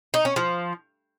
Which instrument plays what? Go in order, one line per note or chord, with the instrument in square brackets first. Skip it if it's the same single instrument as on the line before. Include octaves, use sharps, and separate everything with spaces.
[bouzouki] D#4
C#4
F3